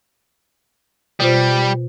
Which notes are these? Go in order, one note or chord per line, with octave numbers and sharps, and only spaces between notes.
B2 G3 F4 C5